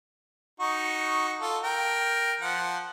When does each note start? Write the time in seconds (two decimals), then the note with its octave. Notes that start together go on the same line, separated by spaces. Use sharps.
0.60 D#4 F#4 C#6
1.41 F4 A4
1.63 A#4 G5
2.41 F3 F#5